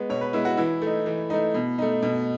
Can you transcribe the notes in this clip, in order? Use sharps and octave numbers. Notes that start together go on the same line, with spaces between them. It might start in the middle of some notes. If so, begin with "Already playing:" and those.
Already playing: G#3 B3
B2 C#5
B4
G#3 B3 E4
F#4
E3 E4
A3 D#4
E3
A3 D#4
B2
A3 D#4
B2